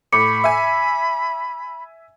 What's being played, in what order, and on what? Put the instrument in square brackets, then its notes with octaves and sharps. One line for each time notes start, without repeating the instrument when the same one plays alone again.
[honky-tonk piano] A2 [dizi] B5 [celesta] D6 C#7
[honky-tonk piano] E5 G#5